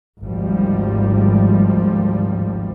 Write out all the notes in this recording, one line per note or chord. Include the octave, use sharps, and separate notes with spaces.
G#1 D2 F3 G3